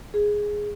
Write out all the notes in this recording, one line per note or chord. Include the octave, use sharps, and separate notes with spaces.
G#4